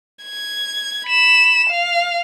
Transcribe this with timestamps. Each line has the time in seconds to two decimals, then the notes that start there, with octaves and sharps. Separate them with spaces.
0.25 G#6
1.07 B5 E7
1.70 F5